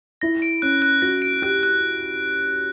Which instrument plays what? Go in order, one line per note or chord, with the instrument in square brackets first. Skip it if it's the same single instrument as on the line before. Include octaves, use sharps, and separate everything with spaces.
[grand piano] E4 [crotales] A#6
[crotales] D7
[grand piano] C#4 [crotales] F#6
[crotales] F#6
[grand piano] F#4 [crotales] A#6
[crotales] D7
[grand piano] G4 [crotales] F#6
[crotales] F#6